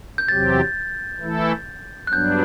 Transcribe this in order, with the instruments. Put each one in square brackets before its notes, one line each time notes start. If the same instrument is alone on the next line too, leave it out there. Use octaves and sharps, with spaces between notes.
[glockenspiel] G6
[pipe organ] E2 C3 F#3 C4 G4 [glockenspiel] A6
[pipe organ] E3 A3 E4 A4
[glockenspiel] F#6
[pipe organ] G2 F#3 B3 D4 [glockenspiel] G6